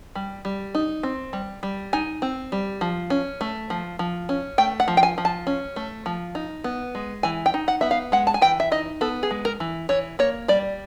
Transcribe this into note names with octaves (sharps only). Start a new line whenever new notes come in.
G3
G3
D#4
C4
G3
G3
D#4 G#5
C4
G3
F3
C#4
A3
F3
F3
C#4
A3 G5
F#5
F3
G5
G#5
F3
A5
C#4
A3
F3
D#4
B3
G#3
E3 G#5
G5
D#4
F#5
B3 E5
F5
G#3 F#5
A5
G#5
E3 G5
E5
D#4 D#5
B3 A4
G#4
G#3
A#4
E3
E3 C#5
A#3 C#5
G3 D5